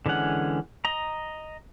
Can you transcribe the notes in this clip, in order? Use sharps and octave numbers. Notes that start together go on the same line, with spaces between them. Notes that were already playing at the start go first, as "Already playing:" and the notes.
D3 E3 G#3 C#4 F#5
D#5 A#5